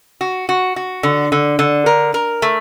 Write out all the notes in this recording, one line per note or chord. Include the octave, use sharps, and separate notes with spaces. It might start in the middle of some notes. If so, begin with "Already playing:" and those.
F#4
F#4
F#4
D3
D3
D3
A#4
A#4
A3